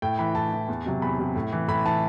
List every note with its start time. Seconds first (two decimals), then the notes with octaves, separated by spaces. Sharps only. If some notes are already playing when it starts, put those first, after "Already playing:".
0.02 A2 G5
0.19 E3 B5
0.35 A2 A5
0.53 E3
0.68 E2
0.86 C3 F#3
1.02 E2 B5
1.19 C3 F#3
1.36 A2
1.53 E3
1.68 A2 B5
1.85 E3 A5